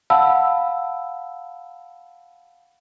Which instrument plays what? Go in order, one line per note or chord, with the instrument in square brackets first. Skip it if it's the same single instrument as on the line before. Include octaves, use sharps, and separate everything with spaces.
[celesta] F5 F#5 A5 B5 E6